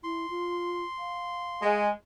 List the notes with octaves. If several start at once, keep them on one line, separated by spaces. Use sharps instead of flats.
E4 C6
F4
F5
G#3